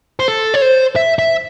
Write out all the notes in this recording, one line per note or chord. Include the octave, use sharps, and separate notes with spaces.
C5
A4
C#5
C5
E5
E5